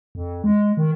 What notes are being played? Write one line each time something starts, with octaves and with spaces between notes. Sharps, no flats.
F2
G#3
D#3